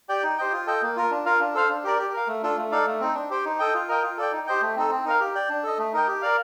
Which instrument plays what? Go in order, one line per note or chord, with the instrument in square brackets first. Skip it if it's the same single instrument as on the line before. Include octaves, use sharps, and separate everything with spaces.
[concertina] G4 D5 G5
D#4
G4 C5 D#5 G5
F4
A4 D#5 G5
A#3
F4 A#4
D4
F4 A#4 F5
D4
A4 C5 F5
D4
G4 A#4 D5
G4
A#4 F5
A3
D4 F4 A4
A3
D#4 A4 D5 F5
A3
C4 D#4
D4
G4 C5 G5
D#4
A4 D#5 G5
F4
A#4 D#5 G5
F4
A4 D5 G5
D#4
G4 C5 D#5 G5
A3
C4 D#4 A4
C4
D#4 A#4 F5
G4
D5 G5
D4
A4 D#5
A3
D#4 A#4 D#5 G5
G4
A#4 D5 F5